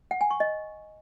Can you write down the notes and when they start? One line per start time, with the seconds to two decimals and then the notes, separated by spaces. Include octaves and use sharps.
0.11 F#5
0.21 G#5
0.31 C#6
0.40 D#5